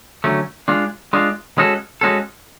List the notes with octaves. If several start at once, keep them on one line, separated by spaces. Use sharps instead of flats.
D3 F#3 A3 C#4
G#3 D4 F4
G#3 D4 F4
G#3 C#4 F#4 A4
G#3 C#4 F#4 A4